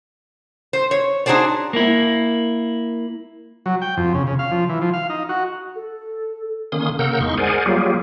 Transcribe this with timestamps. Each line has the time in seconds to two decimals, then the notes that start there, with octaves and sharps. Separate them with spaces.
0.73 C5
0.91 C#5
1.26 D4 D#4 F#4 G#4 C5 D5
1.73 A#3 E4
3.66 F#3
3.82 G5
3.97 F2
4.14 C#3
4.27 C#3
4.39 F5
4.51 F3
4.69 E3
4.81 F3
4.93 F5
5.10 D#4
5.29 F#4
5.76 A4
6.72 D3 D#3 A#3 C#4 C6 D#6
6.99 C#3 A#3 A#4 F#5 E6 G6
7.20 E2 G#3 D#4 C6 C#6
7.37 G#4 A#4 C5 D5 F#5 G#5
7.66 F#3 G3 A#3 F4 G4 G#4